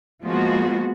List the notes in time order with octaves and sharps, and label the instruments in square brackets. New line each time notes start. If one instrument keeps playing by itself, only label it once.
[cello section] F3 G#3 A#3 B3 F4 F#4